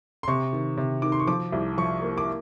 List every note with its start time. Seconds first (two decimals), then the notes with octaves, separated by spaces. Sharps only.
0.23 C6
0.28 C3 C#6
0.53 D#3
0.77 C3
1.02 D#3 D6
1.12 C6
1.20 C#6
1.27 F3 D6
1.52 C2
1.78 F3 C#6
2.02 A#3
2.18 D6